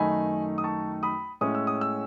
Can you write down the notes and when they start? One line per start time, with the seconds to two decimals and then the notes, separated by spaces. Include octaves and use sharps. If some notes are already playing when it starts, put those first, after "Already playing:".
Already playing: F#2 D#3 A3 D#4 G#5 B5
0.58 D#6
0.64 A5 C#6
1.03 B5 D#6
1.41 A2 G#3 C#4 D#6
1.55 E6
1.67 D#6
1.81 E6